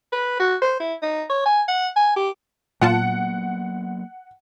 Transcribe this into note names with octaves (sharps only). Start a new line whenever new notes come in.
B4
F#4
C5
E4
D#4
C#5
G#5
F#5
G#5
G4
A#2 F#3 A#3 B3 F4 F#5 A5